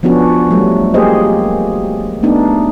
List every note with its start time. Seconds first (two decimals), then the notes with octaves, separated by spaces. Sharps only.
0.03 F3 B3 C#4 D4 F#4
0.50 F#3 G3 A3
0.94 A#3 G4 G#4 C5 D#5
2.23 A3 B3 D4 D#4